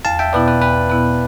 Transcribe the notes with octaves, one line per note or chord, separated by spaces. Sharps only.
E2 F5 A5
E5 G5
B2 B3 E4 B4 D5
B4
E2 B4
B2 B3 E4 B4